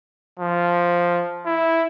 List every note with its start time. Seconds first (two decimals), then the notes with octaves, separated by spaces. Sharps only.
0.39 F3
1.46 E4